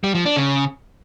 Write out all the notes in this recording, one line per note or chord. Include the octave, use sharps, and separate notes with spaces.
G3
F3
D4
C#3